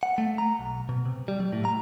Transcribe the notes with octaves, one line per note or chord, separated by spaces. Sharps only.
F#5
A3
A#5
B1
B2
C3
G3
F#3
A2
A#5